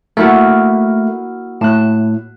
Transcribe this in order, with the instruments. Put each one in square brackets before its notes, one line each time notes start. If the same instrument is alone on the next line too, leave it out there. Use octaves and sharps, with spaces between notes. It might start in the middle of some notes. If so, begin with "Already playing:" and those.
[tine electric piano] A3 [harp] A#3 E4 F#4
[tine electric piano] A2 [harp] F#6 E7